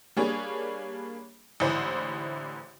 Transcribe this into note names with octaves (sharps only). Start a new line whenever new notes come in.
G3 A#3 D4 G#4 C#5
A1 G#2 D3 E3 C5